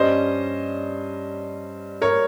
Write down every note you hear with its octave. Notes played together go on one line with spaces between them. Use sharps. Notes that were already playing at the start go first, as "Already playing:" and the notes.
Already playing: G2 G3 C#4 C5 D#5
A#4 C#5